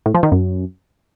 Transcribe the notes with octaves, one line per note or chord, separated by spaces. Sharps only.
A2
F3
D#3
F#2